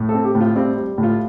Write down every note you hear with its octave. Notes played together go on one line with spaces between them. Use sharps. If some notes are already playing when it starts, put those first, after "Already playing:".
Already playing: A2
A4
C4
G4
A2
F4
G3 C4
G3
A2
F4